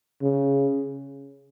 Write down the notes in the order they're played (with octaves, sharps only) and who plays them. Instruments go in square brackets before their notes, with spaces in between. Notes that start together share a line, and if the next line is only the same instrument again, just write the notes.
[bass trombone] C#3